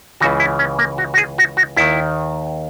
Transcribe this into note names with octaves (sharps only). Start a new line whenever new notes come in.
C#2 C#3 E3 F#4
E4
C#4
A#3
F#4
F#4
G#4
F#4
F#4
D#2 D#3 E4